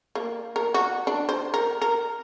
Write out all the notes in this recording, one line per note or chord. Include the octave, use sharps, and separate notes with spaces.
A#3
A#4
F#4
D4
C5
A#4
A#4